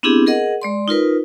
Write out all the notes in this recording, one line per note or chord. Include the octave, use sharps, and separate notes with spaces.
B3 C4 D4 E4 G4 G#4
G#4 A#4 D#5 F#5
G#3 D5 C6
D#4 F4 A#4 B4